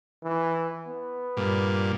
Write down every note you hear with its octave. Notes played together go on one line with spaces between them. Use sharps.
E3
B3
G2 A#2